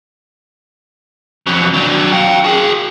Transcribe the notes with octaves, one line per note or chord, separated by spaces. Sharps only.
F2 F#3
F#3 D4
F5 G5
F#4 G#4